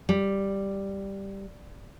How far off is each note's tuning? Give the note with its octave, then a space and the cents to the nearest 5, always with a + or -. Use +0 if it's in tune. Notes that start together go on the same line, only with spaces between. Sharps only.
G3 +0